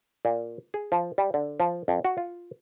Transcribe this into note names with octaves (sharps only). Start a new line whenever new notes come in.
A#2
G#4
F3
G3
D3
F3
F2
F#4
F4